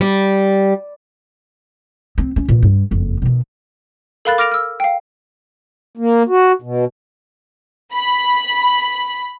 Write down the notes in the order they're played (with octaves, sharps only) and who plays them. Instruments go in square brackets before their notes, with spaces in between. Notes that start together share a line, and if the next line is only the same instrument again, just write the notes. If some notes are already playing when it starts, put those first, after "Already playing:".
[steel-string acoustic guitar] G3
[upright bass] C4
C#4
A#2 E3
G2
F#1 F2
B2 D#3
[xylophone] A4 A#4 F5 B5 F#6 A6
D6 F6 A#6 D7 F7
E6 F6
F5 G5
[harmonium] A#3
F#4
B2
[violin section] B5